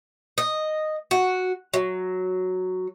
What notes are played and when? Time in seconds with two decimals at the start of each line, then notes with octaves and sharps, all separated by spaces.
0.38 D#5
1.11 F#4
1.74 F#3